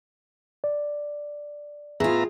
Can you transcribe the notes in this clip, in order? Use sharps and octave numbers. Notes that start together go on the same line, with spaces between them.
D5
A2 B3 F4 G#4 E5 A#5